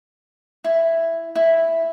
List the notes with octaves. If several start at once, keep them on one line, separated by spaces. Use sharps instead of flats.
E4
E4